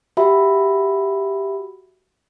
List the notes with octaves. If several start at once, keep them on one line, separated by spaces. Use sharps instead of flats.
F#4 G4 E5 B5